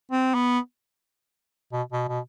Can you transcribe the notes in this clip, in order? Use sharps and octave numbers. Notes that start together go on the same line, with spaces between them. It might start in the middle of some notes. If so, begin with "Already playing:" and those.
C4
B3
B2
B2
B2